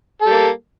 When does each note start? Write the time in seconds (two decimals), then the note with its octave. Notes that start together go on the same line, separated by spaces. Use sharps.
0.21 A4
0.26 G3
0.31 A#3